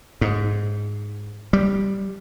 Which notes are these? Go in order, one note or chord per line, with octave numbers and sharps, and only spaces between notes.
G#2
G3